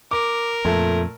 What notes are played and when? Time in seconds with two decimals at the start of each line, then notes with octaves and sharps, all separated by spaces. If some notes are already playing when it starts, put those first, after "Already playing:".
0.11 A#4 D6
0.65 F2 A#2 A3 A5